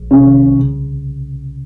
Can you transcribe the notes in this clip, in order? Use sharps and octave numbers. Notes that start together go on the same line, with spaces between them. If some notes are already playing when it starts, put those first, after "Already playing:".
Already playing: A#1
C3 C#4
D#3
C2
C#3